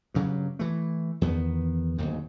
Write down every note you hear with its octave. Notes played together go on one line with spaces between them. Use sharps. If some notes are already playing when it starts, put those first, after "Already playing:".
G2 C#3 F#3
E3 A3
E2 D#3 B3
D1 D#2 G#2